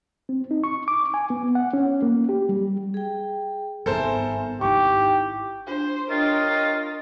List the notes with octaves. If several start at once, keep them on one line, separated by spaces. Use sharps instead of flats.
C4
D#4
C#6
D6
G#5
B3
F#5
C#4
A#3
G4
G3
G#4 G5
G#1 G2 B3 A4 A#4 C5 E5 G#5
G#1 D#3 D#4 E4 G4 G5 C#6
D4 F4 G#4 C5
D4 F4 G4 A#4 C#5 D#5